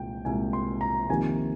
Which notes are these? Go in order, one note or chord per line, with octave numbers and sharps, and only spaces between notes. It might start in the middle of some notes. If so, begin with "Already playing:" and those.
Already playing: C2 A#2 G#3 G5
C2 A#2 G#3 G#5
C6
A#5
F2 C3 D#3 A#3 G#5